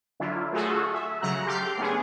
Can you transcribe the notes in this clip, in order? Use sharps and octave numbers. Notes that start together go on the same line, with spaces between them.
D3 F#3 D4 E4 F4
A3 F4 F#4 G#4 A4
E5
C#3 F#3 F#5 A#5 F#6
G4 A4 C6 D6 F6 G6
A3 B3 C#4 D4 G#4